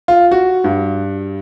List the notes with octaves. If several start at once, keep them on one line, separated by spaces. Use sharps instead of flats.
F4
F#4
G2